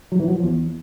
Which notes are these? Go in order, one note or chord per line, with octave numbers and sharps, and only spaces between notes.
F#3
E3
F#3
F3
E2